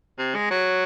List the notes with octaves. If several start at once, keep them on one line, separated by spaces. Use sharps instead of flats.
C3
G#3
F#3